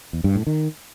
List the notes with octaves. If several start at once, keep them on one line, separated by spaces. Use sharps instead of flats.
E2
G2
A2
D#3